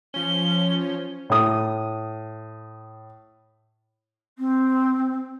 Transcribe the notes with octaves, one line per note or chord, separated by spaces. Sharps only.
F3 C#4 G7
A2 D#6
C4